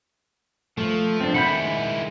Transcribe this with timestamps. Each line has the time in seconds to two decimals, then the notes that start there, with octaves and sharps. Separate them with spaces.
0.78 F3 A3
1.21 C4 D4
1.34 D#3 E4 F#5 B5 G6
1.47 G#3